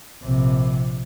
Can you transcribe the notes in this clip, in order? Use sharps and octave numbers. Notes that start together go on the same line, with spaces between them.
A#1 C3